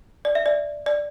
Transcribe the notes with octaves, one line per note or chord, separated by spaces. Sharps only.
D5
E5
D5
D5